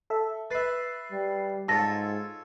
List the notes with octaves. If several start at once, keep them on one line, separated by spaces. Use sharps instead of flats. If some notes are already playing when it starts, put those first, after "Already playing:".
A4 E5
B4 E5 A6 C7
G3
G#2 F4 A4 C#5 A5 E6 A#6